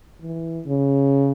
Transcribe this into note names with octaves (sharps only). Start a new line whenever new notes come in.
E3
C#3